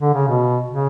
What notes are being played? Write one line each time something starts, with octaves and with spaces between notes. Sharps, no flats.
D3
C#3
B2
C#3